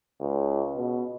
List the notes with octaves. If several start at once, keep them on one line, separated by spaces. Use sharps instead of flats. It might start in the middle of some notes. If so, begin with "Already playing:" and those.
C#2
B2